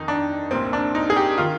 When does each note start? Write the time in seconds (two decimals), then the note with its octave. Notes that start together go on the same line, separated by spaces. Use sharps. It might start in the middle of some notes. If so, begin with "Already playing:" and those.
Already playing: F2 D#3 D#4
0.08 D4
0.51 C2 A#2 C4
0.73 D4
0.95 D#4
1.10 G#4
1.16 G4
1.38 D#3 F4